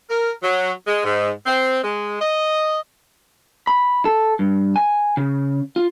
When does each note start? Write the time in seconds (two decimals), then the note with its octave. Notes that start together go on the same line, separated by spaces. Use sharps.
0.10 A#4
0.43 F#3
0.86 G#3
1.04 G#2
1.46 C4
1.84 G#3
2.20 D#5
3.67 B5
4.05 A4
4.39 G2
4.76 G#5
5.17 C#3
5.76 F4